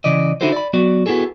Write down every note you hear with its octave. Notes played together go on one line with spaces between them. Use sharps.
C#3 E3 D5 D#5
D3 D#4 E4 F#4 A4 C5
D5 B5
F#3 B3 F#4 D5
B3 E4 F#4 G#4 A4